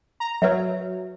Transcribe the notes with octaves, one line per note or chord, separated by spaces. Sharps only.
A#5
F#3 B4 C#5 E5